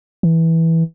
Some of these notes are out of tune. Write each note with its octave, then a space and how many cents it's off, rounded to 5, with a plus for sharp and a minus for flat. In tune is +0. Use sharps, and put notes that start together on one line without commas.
E3 -10